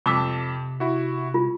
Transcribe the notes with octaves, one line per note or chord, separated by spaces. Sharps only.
F2 C3 A5 D6 E6 B6
E4 F#4
F4